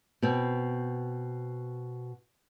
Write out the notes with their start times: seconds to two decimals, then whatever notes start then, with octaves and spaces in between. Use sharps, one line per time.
0.22 B2 C4